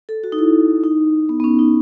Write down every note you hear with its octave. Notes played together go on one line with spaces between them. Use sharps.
A4
F#4
D#4
E4
D#4
B3
B3
C#4
D#4